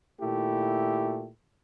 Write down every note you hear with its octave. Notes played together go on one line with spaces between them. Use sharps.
A#2 D#3 A3 E4 G4